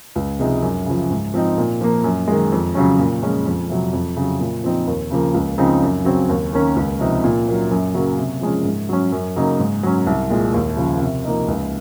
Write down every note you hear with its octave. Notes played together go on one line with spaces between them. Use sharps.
C#2
C3 F3 G#3 D#4
F#2
C#3 F3
G#2
F3 C4 D#4
A#2
F3 A#3
F#2
D#3 G#3
F2
C#3 F#3 C#4
A#2
F3 G#3 C#4
F2
C3 F#3
F2
C#3 F#3
A#2
F3 C4 D#4
D#2
C#3 F3 A#3
C#2
C#3 F3 C4 D#4
F#2
C#3 F#3 C4
D#2
D#3 A#3 C#4
C#2
C3 F3 C4 D#4
A#2
F#3 A#3 C#4
F#2
C#3 F#3 A#3 C#4
C3
F3 G#3 C#4
G#2
F#3 C#4
F#2
C#3 F#3 A#3 D#4
G#2
F#3 C#4
C2
A#2 G#3
D#2
C#3 F3
C3
F3 A#3 D#4
C#2